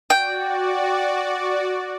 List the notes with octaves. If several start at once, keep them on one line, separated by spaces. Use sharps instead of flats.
F#4 D5 G5